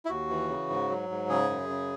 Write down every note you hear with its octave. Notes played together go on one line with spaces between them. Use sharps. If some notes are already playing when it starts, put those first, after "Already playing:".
E4
D#2 F#4
E3
C#3
G#2
F#3
G#2
C#3 G#4
F#2
C#3